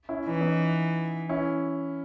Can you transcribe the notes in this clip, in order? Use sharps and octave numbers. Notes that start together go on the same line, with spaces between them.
C#4 E4
E3 D#4
C#4
B3 D#4
C#4 E4